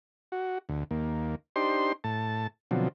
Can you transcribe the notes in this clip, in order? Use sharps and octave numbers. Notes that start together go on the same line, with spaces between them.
F#4
D2
D#2 A#3
D4 D#4 G4 C5 C6
A2 A5
B2 D3 F3 F#3 C4